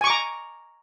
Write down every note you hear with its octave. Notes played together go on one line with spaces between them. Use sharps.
G#5 A#5 C#6 D6